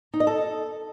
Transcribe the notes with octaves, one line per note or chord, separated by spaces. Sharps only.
D#4
D#5
A4